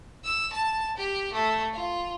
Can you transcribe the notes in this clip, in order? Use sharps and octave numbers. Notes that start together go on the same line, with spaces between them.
E6
A5
G4
A3
F4